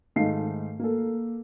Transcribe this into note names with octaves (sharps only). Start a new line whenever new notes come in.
G#2 D#3 A3 F5 C7
A#3 A4